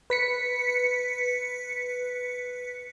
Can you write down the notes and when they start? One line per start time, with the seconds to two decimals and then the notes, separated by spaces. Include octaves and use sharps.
0.10 B4 B6 C#7